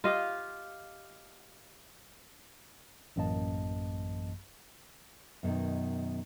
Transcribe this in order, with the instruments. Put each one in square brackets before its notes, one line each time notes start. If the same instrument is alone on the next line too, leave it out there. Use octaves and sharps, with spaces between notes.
[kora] F4 G4 D#5 F5
[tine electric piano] A1 F#2 E3 A#3 D#5 A5
[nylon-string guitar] F#2 B2 D3 D#3